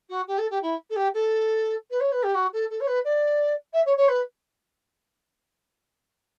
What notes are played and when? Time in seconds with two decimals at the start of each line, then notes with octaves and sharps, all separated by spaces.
0.09 F#4
0.27 G4
0.38 A4
0.50 G4
0.62 E4
0.89 A4
0.95 G4
1.14 A4
1.90 B4
2.00 C#5
2.11 B4
2.23 G4
2.34 F#4
2.53 A4
2.70 A4
2.80 C#5
2.87 B4
3.04 D5
3.73 E5
3.85 C#5
3.97 C#5
4.08 B4